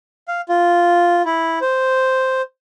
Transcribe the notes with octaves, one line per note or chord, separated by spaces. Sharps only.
F5
F4
E4
C5